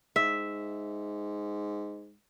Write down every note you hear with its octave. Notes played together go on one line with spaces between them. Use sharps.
G#2 E5